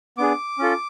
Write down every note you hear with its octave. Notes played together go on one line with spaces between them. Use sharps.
B3 D4 G#4 D6
C#4 F4 A4